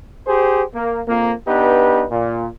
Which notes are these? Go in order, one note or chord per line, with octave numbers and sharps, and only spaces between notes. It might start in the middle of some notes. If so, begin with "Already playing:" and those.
G4 G#4 C5
A#3
F2 A#3
B3 D4 D#4 G4 B4
A#2